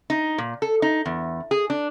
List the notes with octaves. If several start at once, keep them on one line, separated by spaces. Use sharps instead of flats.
D#4
A#2
A4
D#4
E2
G#4
D4